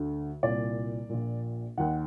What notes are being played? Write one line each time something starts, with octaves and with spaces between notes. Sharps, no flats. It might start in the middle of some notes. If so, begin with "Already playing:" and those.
Already playing: D2 D3
C2 A#2 D5
A#1 A#2
D#2 D#3 F#5